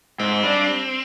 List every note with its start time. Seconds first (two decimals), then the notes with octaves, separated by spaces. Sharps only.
0.19 G#2 C4
0.44 G3 D4